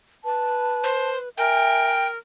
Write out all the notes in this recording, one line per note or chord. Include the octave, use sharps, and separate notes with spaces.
B4 A5
C5
A#4 E5 G5 G#5